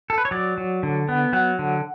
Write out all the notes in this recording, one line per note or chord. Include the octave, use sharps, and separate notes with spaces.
A4
B4
C#5
F#3 D5
F#3
D3
B3
F#3 F#5
D3